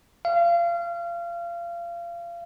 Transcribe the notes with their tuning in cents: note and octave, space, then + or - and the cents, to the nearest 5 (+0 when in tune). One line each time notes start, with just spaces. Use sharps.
F5 -30